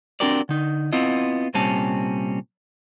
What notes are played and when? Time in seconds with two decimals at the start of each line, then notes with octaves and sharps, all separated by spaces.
0.20 C4 D4 F#4 G4 A#4 D5
0.49 D3 D#4
0.93 B3 C4 E4 F4 D#5
1.54 C2 A#2 G3 C4 C#4 A5